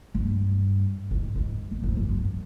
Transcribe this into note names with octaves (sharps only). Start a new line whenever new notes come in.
G2
G#2
G#2
E2
F2
F#2
G2